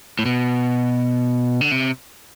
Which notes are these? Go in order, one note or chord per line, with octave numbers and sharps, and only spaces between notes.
A2
B2
D3
C3